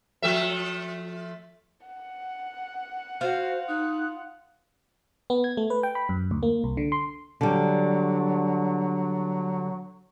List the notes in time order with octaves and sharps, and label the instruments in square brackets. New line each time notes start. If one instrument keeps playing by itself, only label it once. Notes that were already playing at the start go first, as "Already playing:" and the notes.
[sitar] F3 A3 E5
[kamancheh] F#5
[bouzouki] F4 [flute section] F#4 F5 [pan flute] C5
[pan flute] D#4 [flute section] D#6 F#6
[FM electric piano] B3
G#6
A3
B4
G5
B5
F#2
D2
A#3
C2
D3
C6
[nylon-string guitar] D3 G3 [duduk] F#3